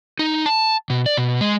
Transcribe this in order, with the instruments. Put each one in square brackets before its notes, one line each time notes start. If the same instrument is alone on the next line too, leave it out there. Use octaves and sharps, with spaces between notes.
[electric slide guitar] D#4
A5
B2
D5
B2
G#3